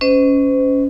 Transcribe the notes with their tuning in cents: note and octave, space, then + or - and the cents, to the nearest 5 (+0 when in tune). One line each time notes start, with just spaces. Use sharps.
C#4 +10 C5 -40 D#5 +0